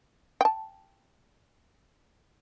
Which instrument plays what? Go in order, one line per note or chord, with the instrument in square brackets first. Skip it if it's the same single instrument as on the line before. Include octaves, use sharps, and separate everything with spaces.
[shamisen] G5 A5